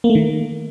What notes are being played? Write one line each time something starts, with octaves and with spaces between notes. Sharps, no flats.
A#3
A3
D#3